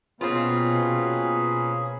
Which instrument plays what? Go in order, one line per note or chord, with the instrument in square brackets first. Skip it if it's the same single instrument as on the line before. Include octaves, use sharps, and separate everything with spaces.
[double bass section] B2 [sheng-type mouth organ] A#3 C#4 B4 [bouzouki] C4 F4 [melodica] G#4